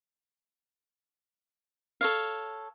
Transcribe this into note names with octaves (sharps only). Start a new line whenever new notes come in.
A4 C#5 F5